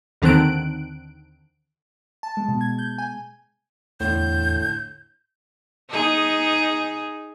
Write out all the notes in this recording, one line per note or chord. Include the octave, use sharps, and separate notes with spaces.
D#2 D3 D#3 C4 F#6 D7
A5
G#3
B2
G#6
G6
G#5
E2 A2 D3 G6
D#4 G#4